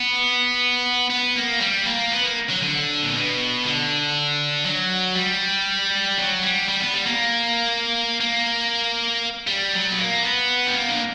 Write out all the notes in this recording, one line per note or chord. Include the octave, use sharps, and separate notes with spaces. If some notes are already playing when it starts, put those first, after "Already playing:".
Already playing: B3
B3
A#3
G3
A#3
B3
A#3
F#3
D3
A#2
B2
D3
F#3
G3
F#3
G3
G3
B3
G3
A#3
A#3
G3
F#3
B3
A#3
B3
G3
A#3
D3